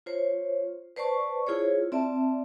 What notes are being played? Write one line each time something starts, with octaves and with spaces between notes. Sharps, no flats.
F4 C5 C#5
B4 C5 D5 A5 C#6
E4 F4 G#4 C5 C#5
C4 D5 E5 A5